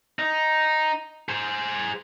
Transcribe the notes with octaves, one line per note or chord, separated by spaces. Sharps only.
D#4
G#4 C5